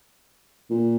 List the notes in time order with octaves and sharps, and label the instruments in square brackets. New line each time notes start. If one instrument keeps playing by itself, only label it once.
[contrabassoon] A#2